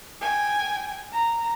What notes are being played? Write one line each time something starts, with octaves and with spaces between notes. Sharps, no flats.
G5 G#5
A#5